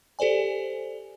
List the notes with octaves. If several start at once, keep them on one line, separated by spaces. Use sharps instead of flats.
G4 A4 C5 D5 G#5